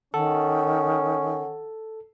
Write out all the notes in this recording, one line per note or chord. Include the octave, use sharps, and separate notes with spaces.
D#3 C#4 A4 F#5